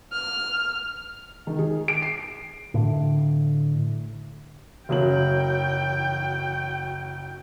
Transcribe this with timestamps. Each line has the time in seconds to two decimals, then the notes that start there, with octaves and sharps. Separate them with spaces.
0.13 F6
1.47 D#3
1.59 G#4
1.88 D7
2.02 C7
2.74 A2 D3
4.89 F#1 F#3 F#4 G5 F#7